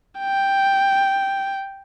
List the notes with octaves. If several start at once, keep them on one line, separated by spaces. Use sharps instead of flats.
G5